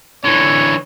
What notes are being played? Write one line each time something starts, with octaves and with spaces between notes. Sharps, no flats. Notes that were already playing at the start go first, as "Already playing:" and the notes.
D3 E3 C#5